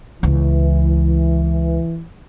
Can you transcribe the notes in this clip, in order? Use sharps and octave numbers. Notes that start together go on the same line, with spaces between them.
C#2 E3